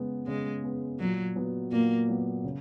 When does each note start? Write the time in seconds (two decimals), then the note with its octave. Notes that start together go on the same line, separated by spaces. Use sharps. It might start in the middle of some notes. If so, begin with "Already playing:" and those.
Already playing: C#3 G#3 B3
0.27 C#3 G#3
0.63 G#3 B3
0.99 A#2 F#3
1.36 F#3 B3
1.72 A#2 A#3
2.08 F#3 B3
2.44 C#3